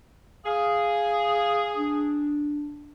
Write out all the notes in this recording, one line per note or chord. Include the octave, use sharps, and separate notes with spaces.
G#4 F5
D4